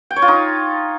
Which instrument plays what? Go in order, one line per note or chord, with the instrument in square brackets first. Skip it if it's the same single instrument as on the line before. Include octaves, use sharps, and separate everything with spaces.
[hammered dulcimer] G5
C#5
F4
D#4